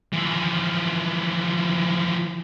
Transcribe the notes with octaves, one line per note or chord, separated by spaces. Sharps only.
E3 F3